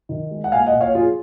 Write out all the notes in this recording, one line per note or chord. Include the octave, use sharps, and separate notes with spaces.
D#3
G#3
F#5
A#2 F5 G#5
D#5 F#5
A#2
C#5 F5
F3 F4 G#4